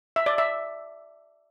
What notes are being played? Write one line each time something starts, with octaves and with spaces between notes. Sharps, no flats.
E5
D5
E5